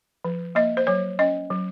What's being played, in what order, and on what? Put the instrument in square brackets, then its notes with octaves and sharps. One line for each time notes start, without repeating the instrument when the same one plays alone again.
[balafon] F3
A#3 D#5
C5
F#3 C#5
C#4 D#5
F#3